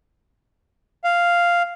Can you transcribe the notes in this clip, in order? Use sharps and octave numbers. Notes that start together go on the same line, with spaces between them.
F5